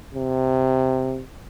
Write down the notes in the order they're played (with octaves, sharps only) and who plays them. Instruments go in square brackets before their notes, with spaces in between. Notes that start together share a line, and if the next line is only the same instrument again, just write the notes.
[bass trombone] C3